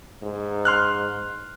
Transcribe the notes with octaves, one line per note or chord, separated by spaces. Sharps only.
G#2
C6 F6 F#6